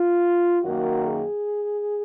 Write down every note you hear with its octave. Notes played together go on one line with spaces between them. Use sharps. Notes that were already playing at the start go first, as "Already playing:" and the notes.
Already playing: F4
F#2 D#3 A#3 F#4
G#4